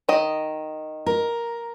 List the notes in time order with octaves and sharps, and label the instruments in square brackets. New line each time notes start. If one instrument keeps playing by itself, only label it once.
[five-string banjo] D#3 D#5
[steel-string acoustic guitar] A#4